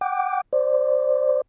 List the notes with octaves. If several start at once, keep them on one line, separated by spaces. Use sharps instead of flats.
F#5 G5 D6
C5 D5